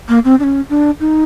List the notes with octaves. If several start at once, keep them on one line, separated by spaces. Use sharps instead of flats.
A#3
C4
D4
C#4
D4
D#4